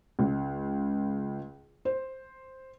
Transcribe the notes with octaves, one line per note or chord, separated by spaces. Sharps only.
C#2
C5